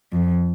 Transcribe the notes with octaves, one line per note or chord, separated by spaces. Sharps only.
F2